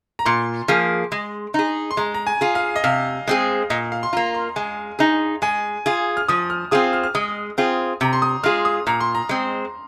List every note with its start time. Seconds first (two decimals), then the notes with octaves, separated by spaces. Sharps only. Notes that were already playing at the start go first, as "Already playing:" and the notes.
0.19 A#5
0.26 A#2 C6
0.68 F3 A#3 G#4
1.12 G#3
1.54 D#4 G#4
1.91 C6
1.97 G#3 A#5
2.14 A#5
2.27 G#5
2.41 F4 G#4
2.55 F5
2.76 D#5
2.84 C3 F5
3.27 G#3 C4 G#4
3.70 A#2 D#5
3.92 F5
4.03 C6
4.13 F4 A#5
4.17 A#3
4.34 C6
4.56 G#3 G#5
4.99 D#4 G#4
5.42 G#3 G#5
5.86 F4 G#4
6.17 F6
6.28 F3 D#6
6.50 F6
6.71 C4 F4 G#4 D#6
6.93 F6
7.04 F6
7.15 G#3 D#6
7.58 C4 F4 G#4
8.01 C3 A#5
8.13 C6
8.22 D#6
8.43 G#3 F4 G#4 F6
8.65 D#6
8.87 A#2 A#5
9.01 C6
9.15 A#5
9.29 G#3 C4